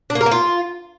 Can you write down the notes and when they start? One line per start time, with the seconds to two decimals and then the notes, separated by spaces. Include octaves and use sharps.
0.10 D4
0.15 A#3
0.21 A#4
0.26 A#3
0.32 F4